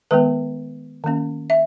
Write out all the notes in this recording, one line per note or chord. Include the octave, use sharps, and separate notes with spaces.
D#3 G#3 B3 B4
D#3 A#3 C#4
E5